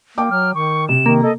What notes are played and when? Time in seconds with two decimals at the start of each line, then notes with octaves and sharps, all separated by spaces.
0.18 A#3 G5 D6
0.31 F#3 F6
0.55 D#3 C#6
0.89 C3 E7
1.06 D#3 A#3
1.23 A4 D#5